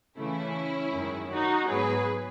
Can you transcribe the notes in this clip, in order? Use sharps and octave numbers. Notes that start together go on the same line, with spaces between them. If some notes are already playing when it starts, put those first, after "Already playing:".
C#3 E3 A3 C#4 E4
F#2 D#3 G#3
D#4 F#4
G#2 F#3 B3 G#4 B4